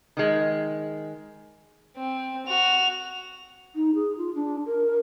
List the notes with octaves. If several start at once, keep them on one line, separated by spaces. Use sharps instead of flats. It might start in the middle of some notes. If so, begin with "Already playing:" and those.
D#3 G#3
C4
F#4 F7
D#4
G#4
F4
D4
A#4